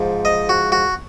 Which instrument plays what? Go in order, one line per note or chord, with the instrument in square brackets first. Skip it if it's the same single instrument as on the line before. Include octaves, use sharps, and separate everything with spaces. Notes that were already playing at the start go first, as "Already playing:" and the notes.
Already playing: [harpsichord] G#2 F3
D#5
F#4
F#4